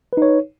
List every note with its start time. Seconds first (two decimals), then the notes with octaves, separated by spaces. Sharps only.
0.13 B4
0.17 D#4
0.22 C#5